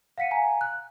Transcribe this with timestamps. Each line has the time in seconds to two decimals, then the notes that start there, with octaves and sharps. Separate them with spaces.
0.18 F5 F#5 B6 C#7 D#7
0.31 F5 G#5 A#5
0.61 F#6